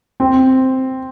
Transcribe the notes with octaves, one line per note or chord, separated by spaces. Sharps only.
C4